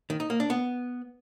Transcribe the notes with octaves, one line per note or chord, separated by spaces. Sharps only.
D#3
D#4
A#3
D4
B3